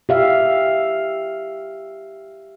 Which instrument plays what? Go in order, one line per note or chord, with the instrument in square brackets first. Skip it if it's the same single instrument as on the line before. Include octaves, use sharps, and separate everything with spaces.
[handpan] G4 E5 F5